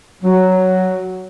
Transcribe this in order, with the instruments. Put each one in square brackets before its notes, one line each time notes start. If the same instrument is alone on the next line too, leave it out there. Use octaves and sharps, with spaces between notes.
[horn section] F#3